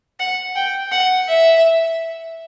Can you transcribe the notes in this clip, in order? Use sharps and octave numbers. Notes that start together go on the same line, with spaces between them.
F#5
G5
F#5
E5